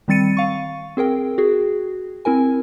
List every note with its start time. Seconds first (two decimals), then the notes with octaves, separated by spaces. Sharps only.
0.08 D#3 G3 C4 A6 C#7 D#7
0.37 F5 C#6
0.97 C4 G#4 A#4 G5
1.38 F#4 G#4
2.25 C4 E4 A#4 G#5